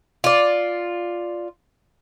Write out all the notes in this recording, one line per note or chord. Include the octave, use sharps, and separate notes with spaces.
F4 D5